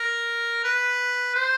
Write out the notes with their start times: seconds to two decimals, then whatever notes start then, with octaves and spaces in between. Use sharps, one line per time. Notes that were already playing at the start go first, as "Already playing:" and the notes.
Already playing: A#4
0.64 B4
1.36 C5